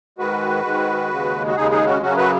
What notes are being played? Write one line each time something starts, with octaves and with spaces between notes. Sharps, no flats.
G#2 D#3 G#3 F#4 B4
G#2 D#3 G#3
D#2 C#3 G#3
F#4
D#2 C#3 G#3 D#4 G#4
D#4 G#4
C#4 F#4
F#2 C#3 F#3 C#4 F#4
F#4 B4